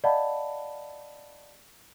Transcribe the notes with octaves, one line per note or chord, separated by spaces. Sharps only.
D5 D#5 F5 F#5 A5 B5